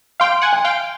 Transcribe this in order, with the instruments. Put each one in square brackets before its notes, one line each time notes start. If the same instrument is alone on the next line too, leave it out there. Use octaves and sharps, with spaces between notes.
[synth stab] F5 G5 [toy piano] C6
[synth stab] F#5 G#5
[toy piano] G#5
[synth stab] F5 G5